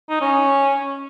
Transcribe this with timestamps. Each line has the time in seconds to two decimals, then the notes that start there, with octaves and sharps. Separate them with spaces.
0.10 D#4
0.21 C#4